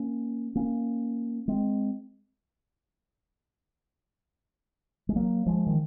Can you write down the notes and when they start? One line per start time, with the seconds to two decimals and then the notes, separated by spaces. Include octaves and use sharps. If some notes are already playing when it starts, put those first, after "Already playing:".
Already playing: A#3 C#4
0.55 A#3 C#4
1.48 G#3 C4
5.09 G#3
5.16 F#3 A#3
5.46 F3 G#3
5.67 D#3